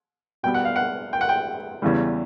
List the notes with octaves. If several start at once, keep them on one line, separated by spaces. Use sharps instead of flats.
B2 G3 B3 G5
F#5
F5
F#5
G5
F#5
G5
E2 C#3 E3 G3